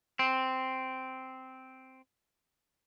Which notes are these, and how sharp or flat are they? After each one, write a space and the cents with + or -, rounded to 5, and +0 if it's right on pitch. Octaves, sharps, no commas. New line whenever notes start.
C4 -5